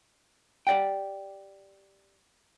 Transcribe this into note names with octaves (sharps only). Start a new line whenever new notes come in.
G4 D5 D#5 F#5 G5